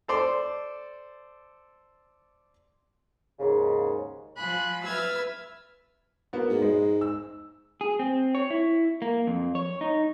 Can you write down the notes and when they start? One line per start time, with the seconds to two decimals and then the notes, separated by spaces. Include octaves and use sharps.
0.08 A4 C5 D5
3.40 D#2 G#2 C#3
4.37 F3 G#5 B5 F#6
4.85 B4 E5 E6 F6 G#6 A6
6.33 A#3 B3 F#4
6.49 G#2
6.62 G#3
7.01 E6
7.81 G#4
7.99 C4
8.35 C#5
8.50 E4
9.02 A#3
9.27 F2
9.55 C#5
9.81 D#4